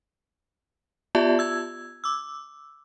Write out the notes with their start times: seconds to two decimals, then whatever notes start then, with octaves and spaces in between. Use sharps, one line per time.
1.15 B3 F4 G4 D5 E5 A5
1.39 E6 G#6
2.04 D6 E6